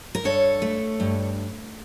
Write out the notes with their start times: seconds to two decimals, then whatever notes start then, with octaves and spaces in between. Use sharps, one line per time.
0.15 A#4
0.24 G2 A4 C#5
0.62 A3
1.00 G2